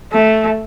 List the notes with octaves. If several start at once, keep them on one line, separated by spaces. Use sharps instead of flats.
A3